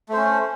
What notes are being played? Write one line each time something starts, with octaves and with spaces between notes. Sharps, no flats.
A3 C#4 C5